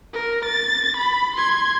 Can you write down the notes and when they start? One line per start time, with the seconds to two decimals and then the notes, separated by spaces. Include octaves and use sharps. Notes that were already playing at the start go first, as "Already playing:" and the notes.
0.13 A#4
0.45 A6
0.97 B5
1.36 C6 G#6